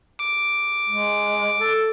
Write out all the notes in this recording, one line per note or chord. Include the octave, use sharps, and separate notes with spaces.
D6
G#3
A4